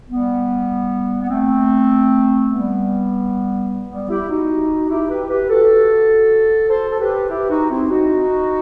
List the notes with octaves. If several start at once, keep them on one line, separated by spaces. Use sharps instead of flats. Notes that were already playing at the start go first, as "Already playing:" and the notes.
G3 B3
B3
A3 C4
G3 B3
G3 B3
E4 G4
D#4 F#4
E4 G4
G4 B4
G4 B4
F#4 A4
A4 C5
A4
G4 B4
E4 G4
D#4 F#4
C4 E4
D#4 F#4